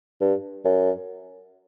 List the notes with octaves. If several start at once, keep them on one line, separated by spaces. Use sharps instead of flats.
G2
F#2